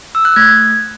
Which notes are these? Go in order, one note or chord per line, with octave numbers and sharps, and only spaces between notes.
E6
F#6
A3 G#6